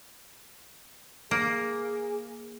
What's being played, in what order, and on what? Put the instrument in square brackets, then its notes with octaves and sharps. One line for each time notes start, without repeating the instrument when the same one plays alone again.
[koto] A#3 [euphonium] G#4